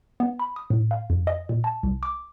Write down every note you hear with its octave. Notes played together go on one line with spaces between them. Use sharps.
B3
B5
D#6
A2
F5
F2
D#5
A#2
A5
C2
D6